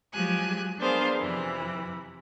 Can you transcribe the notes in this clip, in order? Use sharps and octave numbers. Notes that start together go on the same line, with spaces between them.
F3 F#3 G#3 G4 G#5 F#6
B3 D4 G#4 A#4 C5 F5
F2 C3 E3 B5